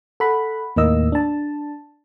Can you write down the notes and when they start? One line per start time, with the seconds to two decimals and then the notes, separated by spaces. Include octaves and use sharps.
0.20 A4 F#5 B5
0.76 D#2 A2 A#3 D#4 D#5 E6
1.12 D4 A5